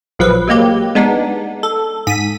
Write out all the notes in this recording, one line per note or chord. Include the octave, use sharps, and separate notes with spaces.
A#1 F3 F#3 B4
F#3 G#3 A#3 G4
G#3 B3 D4 D#4
A4
G#2 B6 D#7